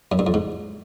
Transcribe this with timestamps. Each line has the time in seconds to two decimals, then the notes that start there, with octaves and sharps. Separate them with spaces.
0.12 F#2
0.19 G2
0.27 F2
0.34 G#2